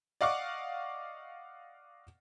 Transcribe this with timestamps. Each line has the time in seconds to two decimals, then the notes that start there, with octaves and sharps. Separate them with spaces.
0.21 D5 D#5 F5 F#5 C#6 D6